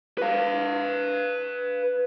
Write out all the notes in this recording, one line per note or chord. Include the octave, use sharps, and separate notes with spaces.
B4 F5